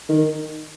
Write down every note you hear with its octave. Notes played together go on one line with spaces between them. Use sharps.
D#3